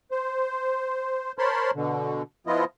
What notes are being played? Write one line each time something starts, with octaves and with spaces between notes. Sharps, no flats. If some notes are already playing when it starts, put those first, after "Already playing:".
C5
A#4 C5 C#5 A5 B5 C6
B2 D3
F3 B3 E4 F4 D#5